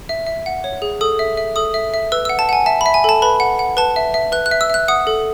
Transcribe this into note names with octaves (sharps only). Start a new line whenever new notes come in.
E5
E5
F#5
C#5
G#4
A4 D#6
E5
E5
A4 D#6
E5
E5
B4 E6
E6
F#5
A5
F#5 G#5
E5 A5
B5
E5
G#5
A4 A5
B4 B5
F#5
F#5
B4 A5
E5
E5
B4 F#6
F#6
E5
E6
E5 F#6
F#5 D#6
A4